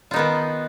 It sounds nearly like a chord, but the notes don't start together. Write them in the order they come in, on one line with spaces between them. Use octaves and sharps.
F4 D#4 B3 D#3